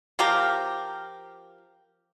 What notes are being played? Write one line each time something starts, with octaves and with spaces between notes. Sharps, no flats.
F3 C4 G4 A#4